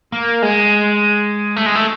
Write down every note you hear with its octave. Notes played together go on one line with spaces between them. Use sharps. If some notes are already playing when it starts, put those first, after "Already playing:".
A#3
G#3
A3
G#3
A3